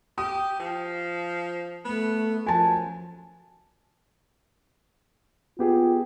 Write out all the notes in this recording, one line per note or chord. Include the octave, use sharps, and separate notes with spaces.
G4 D#6
F3
A3 B3
F#2 F3 G#5 A5
B3 F4 G4 G#4